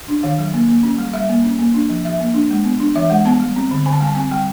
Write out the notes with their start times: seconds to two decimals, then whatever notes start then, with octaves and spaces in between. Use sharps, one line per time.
0.08 D4
0.23 D#3 F5
0.39 F#3
0.54 A#3
0.69 A#3
0.83 C#4
0.98 G3
1.13 G3 E5
1.29 A#3
1.44 C#4
1.59 A#3
1.74 D4
1.89 F3
2.05 F3 E5
2.20 A#3
2.34 D4
2.50 G#3
2.64 B3
2.80 D4
2.95 E3 E5
3.10 G#3 F#5
3.25 B3 A5
3.40 G3
3.56 C4
3.71 D3
3.86 D3 G#5
3.93 A5
4.00 G3 G#5
4.07 A5
4.15 C4 G#5
4.31 G3 G5